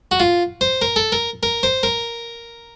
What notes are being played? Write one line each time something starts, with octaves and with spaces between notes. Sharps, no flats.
F#4
F4
C5
A#4
A4
A#4
A#4
C5
A#4